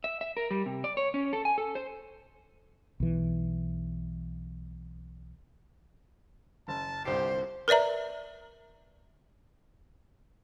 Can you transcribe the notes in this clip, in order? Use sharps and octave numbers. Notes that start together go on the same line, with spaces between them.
E5
E5
A#4
G3
C3
D5
C#5
C#4
A4
G#5
A4
C5
B1 E3
F#1 A5
G1 C2 G4 C5 C7
A#4 B4 D5 E5 A#5